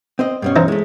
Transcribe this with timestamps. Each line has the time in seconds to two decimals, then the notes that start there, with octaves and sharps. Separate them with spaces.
0.19 C4 C5 D#5
0.42 G2 B2 C#4
0.56 E3 D#4 C5
0.68 G#3 A3